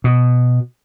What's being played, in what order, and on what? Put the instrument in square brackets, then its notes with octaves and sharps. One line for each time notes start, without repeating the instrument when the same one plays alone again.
[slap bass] B2